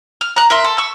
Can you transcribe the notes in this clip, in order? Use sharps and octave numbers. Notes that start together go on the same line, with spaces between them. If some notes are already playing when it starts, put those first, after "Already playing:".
F6
A#5 F#6
A#4 E5 C6
A4
C#6 E6